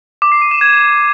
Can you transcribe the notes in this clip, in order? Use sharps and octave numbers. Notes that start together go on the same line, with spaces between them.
D6
C7
D#7
E7
G#6